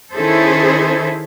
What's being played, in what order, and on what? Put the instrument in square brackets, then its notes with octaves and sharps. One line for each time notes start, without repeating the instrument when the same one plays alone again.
[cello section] D#3 C#4 E4 G#4 A4 C5